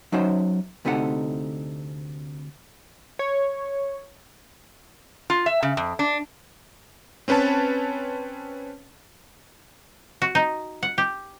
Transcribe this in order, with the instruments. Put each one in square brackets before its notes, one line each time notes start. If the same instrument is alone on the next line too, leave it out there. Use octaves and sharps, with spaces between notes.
[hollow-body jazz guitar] F#3 C#4 D#4 C5 E5 F#5
D2 C3 A3 D#4 F#4 F#5
[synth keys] C#5
[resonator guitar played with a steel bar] F4
E5
C#3
F2
D4
[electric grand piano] C4 C#4 B4 C#5 A5
[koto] F#4
D#4
F#5
G4